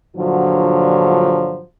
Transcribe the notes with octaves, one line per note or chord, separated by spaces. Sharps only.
G2 A#2 D3 F3 F#3